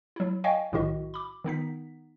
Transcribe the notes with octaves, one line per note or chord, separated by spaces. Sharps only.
F#3 E4
C#5 D#5 F5 G5 G#5 C#6
B1 A2 D#3 E4 F#4 D#5
B5 D6
D#3 B3 D#4 B6